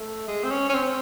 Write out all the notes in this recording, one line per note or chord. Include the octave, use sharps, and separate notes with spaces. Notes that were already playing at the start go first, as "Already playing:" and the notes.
Already playing: A3
G#3
C4
C#4
C#4
C4